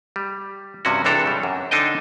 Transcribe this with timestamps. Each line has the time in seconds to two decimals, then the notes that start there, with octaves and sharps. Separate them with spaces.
0.16 G3
0.85 G2 C3 C#4 F#4
1.05 C#2 C3 E3 D4 A4 A#5
1.26 F#3 G3
1.43 F#2
1.71 D3 D4 D#4 A4 D#5 G5